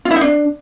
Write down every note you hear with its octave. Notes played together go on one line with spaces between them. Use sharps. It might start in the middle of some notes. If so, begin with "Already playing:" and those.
F4
E4
D#4
D4